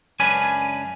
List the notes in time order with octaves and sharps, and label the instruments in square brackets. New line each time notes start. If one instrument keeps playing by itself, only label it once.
[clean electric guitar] C#2 F#2 C#4 D4 B4 G#5